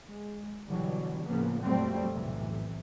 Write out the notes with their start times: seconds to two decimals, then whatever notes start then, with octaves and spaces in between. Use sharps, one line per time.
0.10 G#3
0.67 B2 D3 E3 F#3 G3
1.26 A2 C#3 F3 A#3 B3
1.62 F2 A#2 F#3 G3 A3 C4
2.13 B1 A2 C3 E3